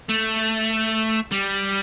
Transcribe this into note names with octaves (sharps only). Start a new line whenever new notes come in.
A3
G3